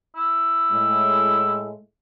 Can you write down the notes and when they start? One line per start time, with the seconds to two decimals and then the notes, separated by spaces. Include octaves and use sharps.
0.15 E4
0.72 A2 G#3